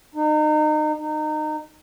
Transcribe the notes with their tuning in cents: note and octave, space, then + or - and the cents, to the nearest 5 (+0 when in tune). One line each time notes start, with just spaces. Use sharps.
D#4 -30
D#4 -25